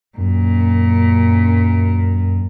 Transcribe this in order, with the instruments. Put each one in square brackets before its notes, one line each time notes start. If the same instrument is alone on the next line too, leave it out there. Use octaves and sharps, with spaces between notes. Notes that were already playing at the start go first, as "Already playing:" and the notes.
[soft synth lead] F#2 [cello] A#2